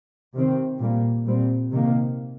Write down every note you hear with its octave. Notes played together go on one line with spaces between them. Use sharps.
C3 D#3 C4
A#2 G3 A#3
A#2 G3 C4
C3 D#3 A#3